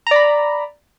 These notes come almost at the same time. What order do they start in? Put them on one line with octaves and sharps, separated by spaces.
A#5 D5 B5